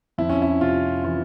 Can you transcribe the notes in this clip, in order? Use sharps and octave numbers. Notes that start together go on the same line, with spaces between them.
F2 E4
C#4
E4
C3 F4
E3 F4